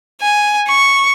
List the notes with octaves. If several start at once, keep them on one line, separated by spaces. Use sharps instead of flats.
G#5
C#6